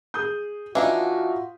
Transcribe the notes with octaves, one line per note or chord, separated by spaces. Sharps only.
G#4 D#6 G6
E3 D4 D#4 F4 F#4 E5 F5 A#5